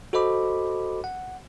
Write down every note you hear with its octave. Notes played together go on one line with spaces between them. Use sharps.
F#4 A4 C5 D#5 B5 D6
F#5